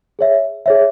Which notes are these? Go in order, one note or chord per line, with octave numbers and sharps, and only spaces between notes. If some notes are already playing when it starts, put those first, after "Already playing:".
G#4 C#5 E5
G#4 C#5 E5